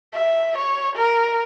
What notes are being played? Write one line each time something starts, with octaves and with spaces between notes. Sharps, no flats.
E5
C#5
A#4